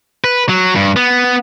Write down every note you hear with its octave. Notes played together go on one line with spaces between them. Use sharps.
B4
F#3
G2
B3